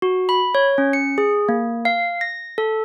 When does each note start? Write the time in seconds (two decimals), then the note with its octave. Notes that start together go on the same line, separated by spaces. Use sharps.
0.02 F#4
0.29 B5
0.55 C#5
0.78 C#4
0.93 C#7
1.18 G#4
1.49 A#3
1.85 F5
2.21 A#6
2.58 A4